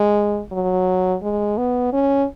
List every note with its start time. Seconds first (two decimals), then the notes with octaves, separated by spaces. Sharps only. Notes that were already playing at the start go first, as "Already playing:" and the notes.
Already playing: G#3
0.52 F#3
1.22 G#3
1.57 B3
1.93 C#4